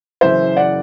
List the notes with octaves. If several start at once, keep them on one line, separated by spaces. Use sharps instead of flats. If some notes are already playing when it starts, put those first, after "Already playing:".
F#1 F#2 E3 C5 E5
D5 F#5